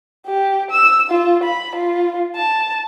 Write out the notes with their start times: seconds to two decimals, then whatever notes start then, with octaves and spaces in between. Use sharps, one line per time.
0.26 G4
0.71 E6
1.10 F4
1.44 B5
1.76 F4
2.36 A5